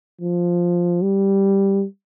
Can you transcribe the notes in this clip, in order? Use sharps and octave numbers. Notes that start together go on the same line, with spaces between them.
F3
G3